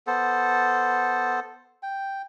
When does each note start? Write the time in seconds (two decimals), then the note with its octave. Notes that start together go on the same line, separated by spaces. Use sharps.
0.07 B3 A4 C5
1.83 G5